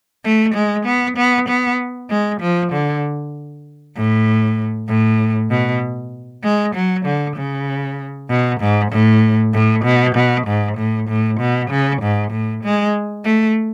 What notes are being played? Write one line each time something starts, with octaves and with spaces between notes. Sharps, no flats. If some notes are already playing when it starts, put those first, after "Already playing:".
A3
G#3
B3
B3
B3
G#3
F3
D3
A2
A2
B2
G#3
F#3
D3
C#3
B2
G#2
A2
A2
B2
B2
G#2
A2
A2
B2
C#3
G#2
A2
G#3
A3